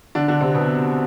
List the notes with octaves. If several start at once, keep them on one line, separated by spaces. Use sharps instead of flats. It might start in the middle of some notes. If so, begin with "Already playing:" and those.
D3 D4
D3 D4
C3 C4
B2 B3